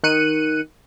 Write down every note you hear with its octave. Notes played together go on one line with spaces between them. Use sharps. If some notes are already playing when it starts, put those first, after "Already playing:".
D#3 F#6 C#7 D#7